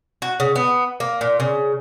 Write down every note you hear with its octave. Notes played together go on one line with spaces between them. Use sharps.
F#4
C#3
B3
A#3
A#2
C#3